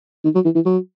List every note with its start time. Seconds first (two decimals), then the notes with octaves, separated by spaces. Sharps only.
0.24 D#3
0.35 F#3
0.45 E3
0.55 E3
0.65 F#3